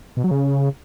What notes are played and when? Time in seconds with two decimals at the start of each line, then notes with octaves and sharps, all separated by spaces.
0.17 B2
0.24 F#3
0.31 C#3